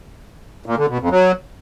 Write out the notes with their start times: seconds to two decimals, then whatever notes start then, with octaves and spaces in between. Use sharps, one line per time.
0.66 A#2
0.77 D3
0.88 B2
1.00 F2
1.11 F#3